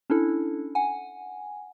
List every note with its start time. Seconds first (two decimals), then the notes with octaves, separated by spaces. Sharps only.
0.10 C#4 D4 E4 A4
0.75 F#5 G#5